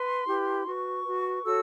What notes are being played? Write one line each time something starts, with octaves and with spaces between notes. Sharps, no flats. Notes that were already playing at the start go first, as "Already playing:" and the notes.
Already playing: B4 C6
E4 G4 B4
F#4 B4 C#6
F#4 B4
F#4 A4 C#5 E6